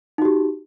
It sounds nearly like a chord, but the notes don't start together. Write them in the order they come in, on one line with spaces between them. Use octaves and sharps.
D#4 F#4 G4